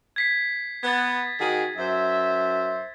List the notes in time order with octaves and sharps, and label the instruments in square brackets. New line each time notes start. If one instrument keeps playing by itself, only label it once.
[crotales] G#6 B6 C7
[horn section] B3 [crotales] G#6 A6
[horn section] D#3 F#4 G#4
F#2 C5 E5